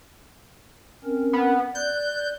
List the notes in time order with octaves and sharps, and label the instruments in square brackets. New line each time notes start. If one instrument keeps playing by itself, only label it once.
[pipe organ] C4 C#4 A#4
[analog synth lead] B3
[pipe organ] D5 F#6 [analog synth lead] G6